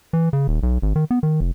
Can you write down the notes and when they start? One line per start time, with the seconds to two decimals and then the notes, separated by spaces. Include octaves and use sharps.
0.13 E3
0.33 C#3
0.48 D#1
0.63 B1
0.82 G#1
0.96 D#3
1.11 B3
1.23 D#3
1.41 F1